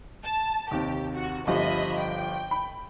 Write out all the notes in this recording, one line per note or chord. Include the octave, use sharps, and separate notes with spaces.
A5
D#2 C3 G4
F#4
G1 F3 G4 D#5 E5 B5
G5
B5